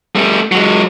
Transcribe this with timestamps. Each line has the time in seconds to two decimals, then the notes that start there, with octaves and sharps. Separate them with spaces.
0.15 G3 A3
0.52 F#3 G#3